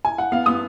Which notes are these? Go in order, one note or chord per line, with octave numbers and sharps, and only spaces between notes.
G#5
F#5
B3 F5
B3 D#6